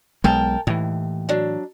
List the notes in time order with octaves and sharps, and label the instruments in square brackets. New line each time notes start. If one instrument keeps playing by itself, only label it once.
[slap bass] B1 B2 G#3 [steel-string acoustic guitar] A#4 G5 A5
[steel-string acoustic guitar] D#2 [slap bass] A2 E3
[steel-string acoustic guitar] F#3 D4